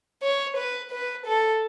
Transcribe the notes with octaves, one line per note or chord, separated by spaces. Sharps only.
C#5
B4
B4
A4